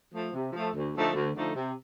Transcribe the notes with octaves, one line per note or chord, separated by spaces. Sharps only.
F3 A3
C3
F3 A3
D2
D3 F3 A3 D#4
D2
D3 F3 A3 D#4
C3